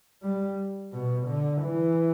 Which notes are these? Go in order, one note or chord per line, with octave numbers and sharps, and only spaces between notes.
G3
B2
D3
E3